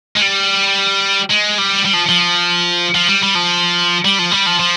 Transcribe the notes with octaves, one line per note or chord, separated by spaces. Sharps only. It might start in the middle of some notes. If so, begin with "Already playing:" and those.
G#3
G3
G#3
G3
G3
F3
F3
F3
G3
G3
F3
G3
F3
G3
F3
F3